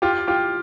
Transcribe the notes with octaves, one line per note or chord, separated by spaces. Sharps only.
F4 G4
F4 G4